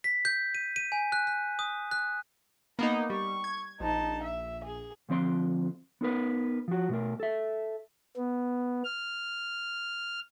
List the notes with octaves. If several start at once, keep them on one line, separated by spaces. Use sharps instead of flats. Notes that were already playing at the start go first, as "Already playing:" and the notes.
B6
G6
D#7
D#7
G#5
F#6
F#6
D#6
F#6
A#3 B3 D#4 B5
G3 C#6
G#6
A#1 D#4 A5
E5
G#4
D2 F3 C4 D5 C6
B3 D#4 A#4 B4
F3 F#4
B2 A3 A#4
A4 E5
B3
F6